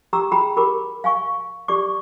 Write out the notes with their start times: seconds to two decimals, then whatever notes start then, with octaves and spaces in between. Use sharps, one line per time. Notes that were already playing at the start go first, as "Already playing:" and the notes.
0.13 G4 G5 A#5 D6 E6
0.31 E4 F#4 G#4 G5 A#5 B5
0.57 G4 A#4 B5 D6
1.04 F5 G#5 C#6
1.68 G4 D5 C#6 D6